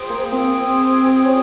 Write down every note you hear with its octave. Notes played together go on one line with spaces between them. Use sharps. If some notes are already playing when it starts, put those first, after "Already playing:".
Already playing: F4 G#4 C5 G5
A#3
C4 F4 G#4 C5 G5
C#4 F4 G#4 C5 G5